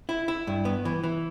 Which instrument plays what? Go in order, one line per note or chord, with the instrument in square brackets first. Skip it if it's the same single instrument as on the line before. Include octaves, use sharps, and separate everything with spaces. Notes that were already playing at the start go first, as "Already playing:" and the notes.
[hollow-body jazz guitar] E4
E4
G2
B3
E3
E3